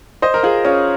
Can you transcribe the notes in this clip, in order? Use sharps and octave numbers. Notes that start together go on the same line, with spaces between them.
C5 D#5
A#4
F4 G#4
C#4 F4